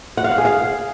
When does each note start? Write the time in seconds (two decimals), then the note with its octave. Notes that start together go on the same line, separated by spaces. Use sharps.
0.17 F#5
0.24 F5
0.31 F#5
0.38 G#4
0.45 F5